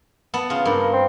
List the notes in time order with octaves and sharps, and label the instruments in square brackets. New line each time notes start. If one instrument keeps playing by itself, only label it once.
[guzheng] B3 A5
C#3 F4
[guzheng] G2 [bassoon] A#3
[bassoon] C4